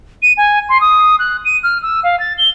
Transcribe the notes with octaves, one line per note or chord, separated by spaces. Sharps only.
D#7
G#5
C6
D#6
F#6
D#7
F6
E6
F5
A6
G7